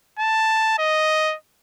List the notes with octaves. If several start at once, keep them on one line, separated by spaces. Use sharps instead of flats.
A5
D#5